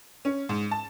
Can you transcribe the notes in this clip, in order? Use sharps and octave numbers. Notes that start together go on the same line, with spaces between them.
C#4
G#2
A5